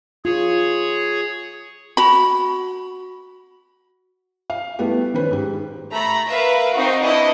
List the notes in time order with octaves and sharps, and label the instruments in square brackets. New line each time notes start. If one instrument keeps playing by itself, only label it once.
[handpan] F4 [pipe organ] G#4 C#5
[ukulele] F#4 B5
[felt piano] F5
G3 A3 B3 E4 G4
D#3 C#4 B4 C5
G#2 G4
[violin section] A3 A#5 B5
A#4 B4 E5 F5
C4 D#4 F#4
D4 E4 B4 D#5